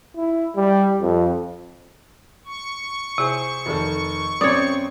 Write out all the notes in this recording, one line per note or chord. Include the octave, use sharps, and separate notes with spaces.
E4
G3
F2
C#6
C3 E4 G#4 C5
F1 D#3 A4
F#2 C#3 C4 C#5 D5 D#6